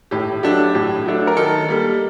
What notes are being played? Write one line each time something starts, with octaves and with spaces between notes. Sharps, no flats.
A2 G4
F#3 A3 D4 G4
A2 G4
F#3 A3 D4
A#4
D#3 A4
G3 A#3